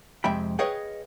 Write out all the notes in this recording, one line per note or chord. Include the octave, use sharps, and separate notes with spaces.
F2 C3 G#3 E5 G5 B5
G#4 B4 C#5 D#5 F5 G5